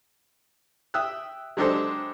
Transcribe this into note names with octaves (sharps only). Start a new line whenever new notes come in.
E5 G5 D#6 E6 F#6
F#3 G#3 D4 G4 A4 C5